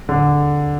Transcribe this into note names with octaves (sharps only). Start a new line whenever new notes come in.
D3